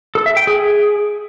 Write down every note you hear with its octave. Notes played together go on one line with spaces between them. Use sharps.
A4
E5
G5
G#4